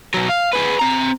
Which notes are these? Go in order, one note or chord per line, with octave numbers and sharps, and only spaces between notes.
B2 F#3
F5
G#4 B4
C4 A#5